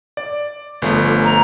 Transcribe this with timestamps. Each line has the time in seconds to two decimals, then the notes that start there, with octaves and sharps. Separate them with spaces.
0.17 D5
0.82 G1 F3 A3
1.24 A#5